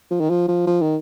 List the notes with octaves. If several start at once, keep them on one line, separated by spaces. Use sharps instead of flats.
F3
D#3
F3
F3
F3
D#3